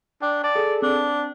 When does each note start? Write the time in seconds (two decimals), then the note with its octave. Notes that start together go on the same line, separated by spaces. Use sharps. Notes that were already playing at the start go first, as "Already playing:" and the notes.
0.22 D4 G5
0.44 D5 A5
0.55 G#4 A4
0.82 C4 D4